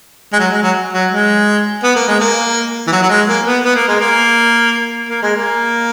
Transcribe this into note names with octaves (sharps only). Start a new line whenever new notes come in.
G#3
F#3
G#3
F#3
F#3
G#3
B3
A#3
G#3
A#3
E3
F#3
F#3
G#3
A#3
B3
B3
A#3
G#3
A#3
A#3
G#3
A#3